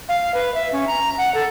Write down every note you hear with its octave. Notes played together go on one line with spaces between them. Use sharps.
F5
B4
E5
C#4
A#5
F#5
A4